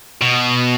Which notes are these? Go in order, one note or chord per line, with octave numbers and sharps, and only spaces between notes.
B2